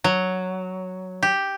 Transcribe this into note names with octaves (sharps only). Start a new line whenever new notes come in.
F#3
G4